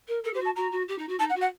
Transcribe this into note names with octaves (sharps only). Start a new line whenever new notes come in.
A#4
A4 A#4
G4 C5
F#4
A5
F#4 A#5
F#4
G4
D#4
F#4
D#4 A5
F#5
F#4
F#5